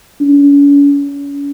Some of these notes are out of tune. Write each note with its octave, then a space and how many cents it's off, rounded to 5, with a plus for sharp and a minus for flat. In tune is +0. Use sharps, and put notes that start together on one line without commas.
C#4 +45